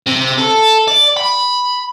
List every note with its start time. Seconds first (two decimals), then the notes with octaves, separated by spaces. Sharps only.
0.06 C3
0.38 A4
0.88 D5
1.17 B5